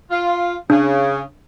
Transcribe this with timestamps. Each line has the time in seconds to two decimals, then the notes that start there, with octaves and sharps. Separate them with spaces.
0.11 F4
0.70 C#3 D4